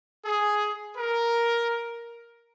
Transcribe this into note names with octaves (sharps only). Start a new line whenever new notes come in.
G#4
A#4